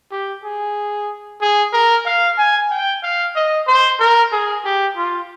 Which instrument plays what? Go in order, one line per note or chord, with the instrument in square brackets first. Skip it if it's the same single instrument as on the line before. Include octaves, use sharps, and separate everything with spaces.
[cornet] G4
G#4
G#4
A#4
F5
G#5
G5
F5
D#5
C5
A#4
G#4
G4
F4